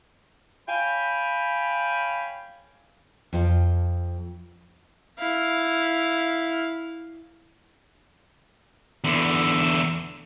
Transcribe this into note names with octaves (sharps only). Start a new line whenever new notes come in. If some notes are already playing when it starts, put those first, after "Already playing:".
C#5 F5 G5 G#5 B5
F2 F4 A5
E4 F5
E2 D3